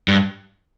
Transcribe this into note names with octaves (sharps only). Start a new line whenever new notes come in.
G2